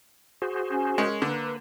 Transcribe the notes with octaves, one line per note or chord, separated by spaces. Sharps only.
F#4 G#4 C5
C#4
G#3 C#4 A#4
D3 A#3 B4